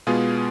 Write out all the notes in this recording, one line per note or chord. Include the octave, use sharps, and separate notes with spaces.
B2 G#3 B3 F4 G#4